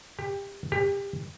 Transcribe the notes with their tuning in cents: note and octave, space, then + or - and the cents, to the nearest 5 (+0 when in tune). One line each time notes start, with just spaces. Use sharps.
G4 +25
G4 +30